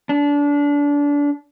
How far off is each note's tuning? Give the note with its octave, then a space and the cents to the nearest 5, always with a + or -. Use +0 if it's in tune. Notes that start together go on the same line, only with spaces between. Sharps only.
D4 -25